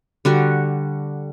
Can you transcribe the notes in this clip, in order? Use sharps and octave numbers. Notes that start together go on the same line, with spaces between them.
D3 G3 F#4